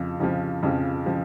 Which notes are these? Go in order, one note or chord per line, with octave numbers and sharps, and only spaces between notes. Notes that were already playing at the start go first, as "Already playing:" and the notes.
Already playing: F2 C#3 F3
F2 C#3 F3
F2 C#3 F3
C#3 F3